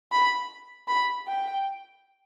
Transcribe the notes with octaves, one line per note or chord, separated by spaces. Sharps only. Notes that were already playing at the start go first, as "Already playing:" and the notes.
B5
B5
G5